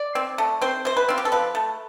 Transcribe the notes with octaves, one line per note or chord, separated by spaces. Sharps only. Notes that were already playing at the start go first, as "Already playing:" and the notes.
Already playing: D5
C4
A3
C4 C5
C3 C5
B4
C4 F4
G4
A4
F3 B4
A3